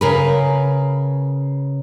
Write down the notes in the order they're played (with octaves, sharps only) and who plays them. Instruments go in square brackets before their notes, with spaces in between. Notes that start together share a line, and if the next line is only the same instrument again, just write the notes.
[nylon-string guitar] C#3 A#4 B4